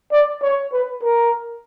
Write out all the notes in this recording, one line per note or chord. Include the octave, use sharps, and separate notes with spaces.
D5
C#5
B4
A#4